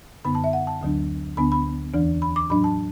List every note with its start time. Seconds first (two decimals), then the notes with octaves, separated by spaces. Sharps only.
0.25 F#2 D3 B3 B5
0.35 A5
0.44 E5
0.53 F#5
0.67 A5
0.81 D2 D3 F#3 D4
1.37 D2 D3 B3 D4 B5
1.52 B5
1.94 E2 E3 D4
2.22 B5
2.36 D6
2.50 A2 F#3 D4 B5
2.64 A5